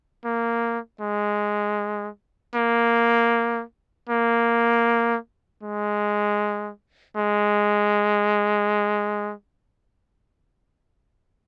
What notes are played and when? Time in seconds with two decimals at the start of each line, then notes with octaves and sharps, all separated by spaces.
0.25 A#3
1.01 G#3
2.55 A#3
4.09 A#3
5.63 G#3
7.17 G#3